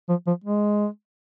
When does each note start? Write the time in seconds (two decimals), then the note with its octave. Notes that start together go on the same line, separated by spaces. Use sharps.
0.09 F3
0.27 F3
0.44 G#3